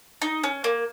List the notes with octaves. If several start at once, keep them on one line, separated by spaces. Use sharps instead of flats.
D#4
C#4
A#3